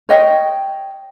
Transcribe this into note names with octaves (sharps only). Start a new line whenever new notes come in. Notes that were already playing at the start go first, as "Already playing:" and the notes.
C#5 D#5 G5